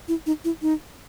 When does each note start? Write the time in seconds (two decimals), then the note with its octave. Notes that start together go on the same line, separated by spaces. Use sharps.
0.08 E4
0.26 D#4
0.45 E4
0.62 D#4